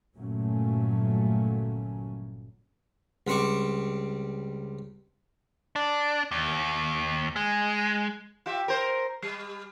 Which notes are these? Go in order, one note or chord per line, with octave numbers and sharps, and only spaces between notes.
G1 A#2 F#3 A3 A#3 C#4
C#2 G3 C4 C#6 D6
D4
D#2
G#3
F4 G4 E5
A#4 C5
G3